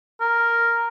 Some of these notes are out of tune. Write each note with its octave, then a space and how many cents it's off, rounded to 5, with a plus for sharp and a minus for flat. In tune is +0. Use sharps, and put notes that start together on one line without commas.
A#4 +0